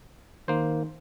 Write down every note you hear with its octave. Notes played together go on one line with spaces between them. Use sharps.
D#3 A#3 C5